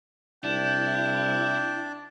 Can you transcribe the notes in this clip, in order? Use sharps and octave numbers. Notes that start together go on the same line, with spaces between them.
C2 D4 E4 D5 G5